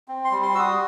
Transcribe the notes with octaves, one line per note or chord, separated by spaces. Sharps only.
C4
C6
G3
C6
F#4 E6
D#6